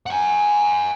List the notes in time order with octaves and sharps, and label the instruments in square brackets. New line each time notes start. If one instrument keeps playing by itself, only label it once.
[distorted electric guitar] F#5 G#5